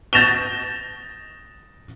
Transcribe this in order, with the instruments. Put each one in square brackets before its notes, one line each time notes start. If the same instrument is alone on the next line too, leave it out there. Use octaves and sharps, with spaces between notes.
[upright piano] G6 A6 A#6 E7 F7 G7